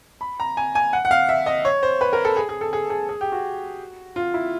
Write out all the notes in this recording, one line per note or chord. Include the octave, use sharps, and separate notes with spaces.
B5
A#5
G#5
G#5
F#5
F#5
F5
E5
D#5
C#5
C5
B4
A#4
A4
G#4
G#4
A4
G#4
G#4
G#4
G4
F#4
F4
E4